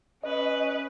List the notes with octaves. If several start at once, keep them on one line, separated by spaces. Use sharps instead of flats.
C#4 B4 D#5